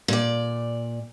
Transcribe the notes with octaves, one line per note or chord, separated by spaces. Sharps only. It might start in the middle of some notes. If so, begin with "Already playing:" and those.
A#2 D5